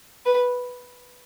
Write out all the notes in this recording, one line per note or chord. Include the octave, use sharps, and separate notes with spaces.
B4